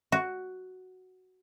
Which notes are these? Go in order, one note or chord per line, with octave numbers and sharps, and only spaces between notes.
F#4